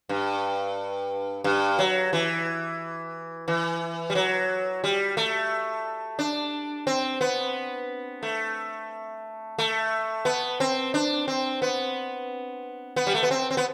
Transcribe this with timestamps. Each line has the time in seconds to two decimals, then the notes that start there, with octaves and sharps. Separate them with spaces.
0.09 G2
1.44 G2
1.79 F#3
2.13 E3
3.48 E3
4.10 G3
4.15 F#3
4.84 G3
5.17 A3
6.19 D4
6.87 C4
7.21 B3
8.23 A3
9.58 A3
10.25 B3
10.60 C4
10.94 D4
11.28 C4
11.62 B3
12.96 B3
13.07 G3
13.15 A3
13.23 B3
13.31 C4
13.51 C4
13.57 B3